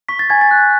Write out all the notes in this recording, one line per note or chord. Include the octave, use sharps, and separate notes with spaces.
C#6 B6
A6
G#5 G#6
A6
F#6